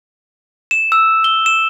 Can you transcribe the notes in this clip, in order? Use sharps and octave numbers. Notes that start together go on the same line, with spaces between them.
E7
E6
G7
E7